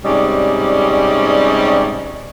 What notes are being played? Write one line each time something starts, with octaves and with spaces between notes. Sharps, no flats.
G#2 C3 G3 C#4 D5 D#5